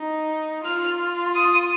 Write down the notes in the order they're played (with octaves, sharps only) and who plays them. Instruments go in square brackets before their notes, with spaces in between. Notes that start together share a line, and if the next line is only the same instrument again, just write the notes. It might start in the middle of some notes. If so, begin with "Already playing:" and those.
Already playing: [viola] D#4
[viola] F4 [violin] F6
[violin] D#6